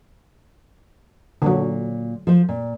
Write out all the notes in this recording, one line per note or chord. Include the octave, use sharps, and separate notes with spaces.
A#2 D3 F#3
F3 C5
A#2